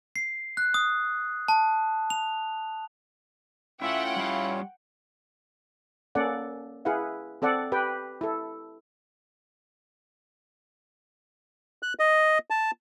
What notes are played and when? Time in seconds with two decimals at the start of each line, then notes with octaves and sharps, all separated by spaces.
0.16 C7
0.57 F#6
0.74 D#6
1.48 A5
2.10 F7
3.82 A3 C#4 E4 F4 C#5 E5 F#5 G5
4.16 G3 E4 F5
6.15 A#3 C#4 A4 D5 F#5
6.85 E4 G#4 B4 F5 F#5
7.42 C4 A4 D5 F#5
7.72 G4 B4 G5
8.21 E4 A4
11.83 F#6
11.99 D#5
12.50 A5